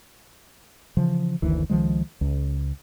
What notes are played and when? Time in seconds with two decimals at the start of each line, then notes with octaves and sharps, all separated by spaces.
0.97 C#3 E3 F3
1.42 F#1 D2 D#3 E3
1.70 C#2 D#3 F3 G#3
2.21 C#2